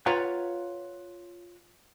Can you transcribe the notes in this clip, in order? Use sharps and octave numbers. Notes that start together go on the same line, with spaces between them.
F4 B4 C#5 F5 F#5 A#5